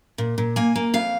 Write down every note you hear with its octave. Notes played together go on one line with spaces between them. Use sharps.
A#2
A#2
A#3 G#5
A#3
F2 F5